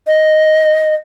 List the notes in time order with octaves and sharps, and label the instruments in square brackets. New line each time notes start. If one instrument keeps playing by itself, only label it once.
[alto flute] D#5